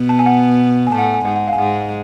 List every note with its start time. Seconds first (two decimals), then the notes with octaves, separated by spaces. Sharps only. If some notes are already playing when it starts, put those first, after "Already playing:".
Already playing: B2 B3
0.09 A5
0.19 G#5
0.26 F#5
0.87 G#5
0.92 A2 A3 A5
0.98 F#5
1.03 G#5
1.14 G#5
1.25 G#2 G#3 F#5
1.36 F#5
1.48 F5
1.53 G#5
1.58 G#2 G#3 F#5